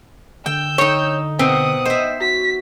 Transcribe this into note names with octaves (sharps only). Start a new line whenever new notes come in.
D3 G5 E6 G6
D#4 C#5 G5
B2 C4 F#5 D#6
C5 D#5 E5
F#4 B6